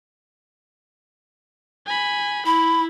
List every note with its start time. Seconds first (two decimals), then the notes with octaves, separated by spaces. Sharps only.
1.86 G#5 B5
2.46 E4 B5